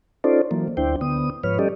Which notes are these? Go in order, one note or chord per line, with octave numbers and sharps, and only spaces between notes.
C#4 D#4 F4 A4 C5 D5
E3 F#3 A#3
D2 D4 E4 C5 G5
D3 B3 D#6
G#2 F3 B4 C#5 F6
G3 C#4 G4 A4 D5 D#5